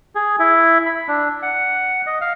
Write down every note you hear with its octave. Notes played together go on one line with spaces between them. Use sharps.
G#4
E4
B5
D4
F#5
D#5
F5